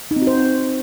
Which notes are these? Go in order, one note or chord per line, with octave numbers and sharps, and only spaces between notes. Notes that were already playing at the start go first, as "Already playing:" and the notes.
D#4
C4
F#4
C5